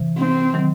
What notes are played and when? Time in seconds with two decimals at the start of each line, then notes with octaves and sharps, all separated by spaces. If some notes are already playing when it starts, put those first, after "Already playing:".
Already playing: C3 E3
0.18 C4
0.54 D#3 F#3